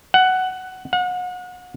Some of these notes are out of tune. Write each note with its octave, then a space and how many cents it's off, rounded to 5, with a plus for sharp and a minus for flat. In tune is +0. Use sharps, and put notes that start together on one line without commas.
F#5 +10
F#5 -35